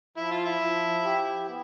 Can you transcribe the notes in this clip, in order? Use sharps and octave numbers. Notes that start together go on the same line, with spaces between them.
F3 E4
F4
E4
F3
G4
B3